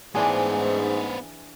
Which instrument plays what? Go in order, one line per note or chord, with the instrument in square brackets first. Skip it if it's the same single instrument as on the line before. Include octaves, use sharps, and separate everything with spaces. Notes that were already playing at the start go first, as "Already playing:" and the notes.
[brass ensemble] G#2 [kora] E3 D4 G#4 [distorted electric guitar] B3 C5